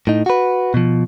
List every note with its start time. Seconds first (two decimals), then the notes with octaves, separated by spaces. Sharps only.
0.07 A2 D#4
0.26 F#4 B4
0.74 B2 F3